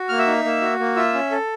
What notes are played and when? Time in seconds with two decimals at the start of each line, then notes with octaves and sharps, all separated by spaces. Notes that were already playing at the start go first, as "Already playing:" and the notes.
Already playing: F#4
0.09 A#3 F6
0.18 E5 E6
0.27 D#4
0.44 A#3
0.61 F#4
0.79 A#3
0.96 F4 E5 E6
1.14 C#4
1.31 A4